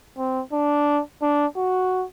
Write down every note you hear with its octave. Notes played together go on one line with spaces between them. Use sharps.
C4
D4
D4
F#4